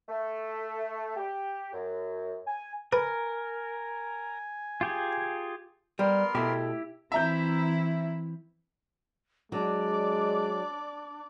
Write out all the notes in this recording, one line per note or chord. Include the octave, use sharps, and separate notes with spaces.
A3
G4
F#2
G#5
A#4 B4 G#5
F4 G4 G#4
G3 B3 A#4 C6
B2 A3 E4 G4
E3 C4 E4 E5 A#5 G6
F#3 G#3 D4 D5 D6